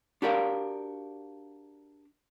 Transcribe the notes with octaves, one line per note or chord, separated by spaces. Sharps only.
D4 F#4 G4 A#4 D5 F5